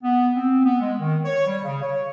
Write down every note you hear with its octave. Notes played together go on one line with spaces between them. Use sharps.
B3
C4
B3
G#3
D#3
C#5
G3
C#3
C#5